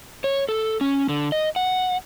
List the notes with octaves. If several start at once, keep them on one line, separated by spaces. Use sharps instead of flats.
C#5
A4
C#4
D3
D#5
F#5